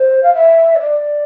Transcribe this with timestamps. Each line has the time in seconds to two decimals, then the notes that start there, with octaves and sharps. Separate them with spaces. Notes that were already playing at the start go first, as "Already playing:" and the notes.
Already playing: C5
0.23 F5
0.34 E5
0.76 C#5
0.79 D5